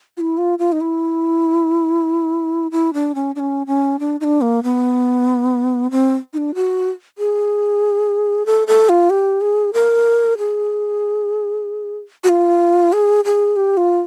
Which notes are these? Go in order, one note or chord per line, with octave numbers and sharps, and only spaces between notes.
F4
E4
F4
F4
D#4
E4
E4
D4
C#4
D4
C#4
C#4
D4
D#4
D4
A#3
B3
C4
D#4
D4
F#4
G#4
A4
A4
F4
G4
G#4
A#4
G#4
F#4
F4
G#4
G#4
G4
F4